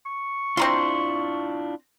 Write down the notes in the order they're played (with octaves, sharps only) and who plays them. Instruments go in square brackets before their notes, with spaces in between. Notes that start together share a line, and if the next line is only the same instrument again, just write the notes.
[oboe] C#6
[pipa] C4 A#5 C6 [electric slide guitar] D4 E4 F4